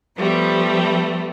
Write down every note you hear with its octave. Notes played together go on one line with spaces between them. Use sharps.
F3 G3 A3 B3